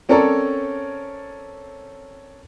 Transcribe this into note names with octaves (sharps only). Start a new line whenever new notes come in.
C4 C#4 A4 A#4 C#5 D5